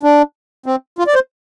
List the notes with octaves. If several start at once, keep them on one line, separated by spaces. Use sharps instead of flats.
D4
C4
F4
D5
C5